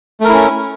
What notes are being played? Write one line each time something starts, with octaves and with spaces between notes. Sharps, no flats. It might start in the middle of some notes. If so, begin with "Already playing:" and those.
A3 C#4 E4 A#4